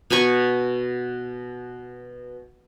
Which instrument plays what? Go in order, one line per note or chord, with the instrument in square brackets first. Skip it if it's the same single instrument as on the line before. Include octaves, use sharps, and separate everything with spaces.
[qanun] B2 G#5 B5 C#6